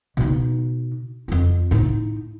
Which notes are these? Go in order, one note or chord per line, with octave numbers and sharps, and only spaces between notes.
B2 D#4
F2 F4
A2 D#4